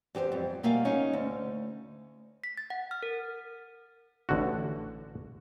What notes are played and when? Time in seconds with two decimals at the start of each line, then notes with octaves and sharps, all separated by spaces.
0.15 E2 G4 G#4 C5
0.32 F2 G3
0.63 B2 G3 A#3 E5 F5 G#5
0.85 C#4 D#4
1.13 D2
2.44 B6
2.58 A6
2.70 F#5
2.91 F6
3.03 A#4
4.29 A1 D3 F#4